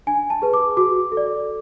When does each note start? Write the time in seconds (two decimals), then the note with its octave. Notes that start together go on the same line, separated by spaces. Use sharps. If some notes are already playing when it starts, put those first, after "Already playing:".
0.07 D4 G#5
0.30 A5
0.42 G#4 B4
0.54 D6
0.77 F#4 D6
1.12 A4
1.17 D5